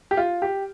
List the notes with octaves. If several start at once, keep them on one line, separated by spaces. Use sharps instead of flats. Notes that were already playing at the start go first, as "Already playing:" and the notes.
G4
F4
G4